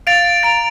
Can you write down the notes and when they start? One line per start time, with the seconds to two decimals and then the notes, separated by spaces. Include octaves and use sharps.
0.07 F5 A6 D7 F7
0.43 A#5 A6 D7 F7